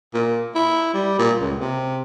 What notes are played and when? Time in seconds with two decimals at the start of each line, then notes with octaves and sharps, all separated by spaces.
0.14 A#2
0.55 E4
0.94 G3
1.19 A#2
1.40 C#2
1.60 C3